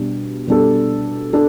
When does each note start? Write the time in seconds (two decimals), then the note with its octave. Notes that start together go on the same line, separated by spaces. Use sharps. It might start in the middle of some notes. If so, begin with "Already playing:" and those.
Already playing: B2 G3 D4
0.47 B2 G3 D4 A4
1.33 D4 A4